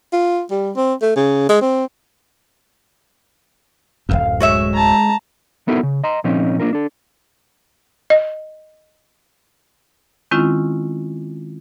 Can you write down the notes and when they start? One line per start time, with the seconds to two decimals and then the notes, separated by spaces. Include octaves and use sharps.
0.13 F4
0.51 G3
0.76 C4
1.02 A3
1.16 C#3
1.49 G#3
1.61 C4
4.09 D1 G1 F#2 F5
4.40 G#3 F#4 C#5 E5
4.74 A5 A#5
5.68 B3 D#4 E4 F#4 A4 A#4
5.83 C#3
6.04 D#5 A#5 C6
6.24 A#2 F3 C4 C#4 D#4
6.59 A#3 D4 F4 A#4
6.73 D4 A4
8.10 D#5
10.31 D#3 G#3 C4 C#4 E4 F4